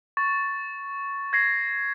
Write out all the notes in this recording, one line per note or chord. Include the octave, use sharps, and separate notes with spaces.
C#6 A6
G#6 A#6 C7